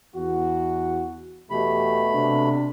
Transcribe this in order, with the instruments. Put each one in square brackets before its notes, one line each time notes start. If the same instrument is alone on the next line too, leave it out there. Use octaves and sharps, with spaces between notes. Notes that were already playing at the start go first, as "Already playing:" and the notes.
[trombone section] E2 F#4
[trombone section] E2 E3 G4 [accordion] B2 A3 B5
[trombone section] C3 D4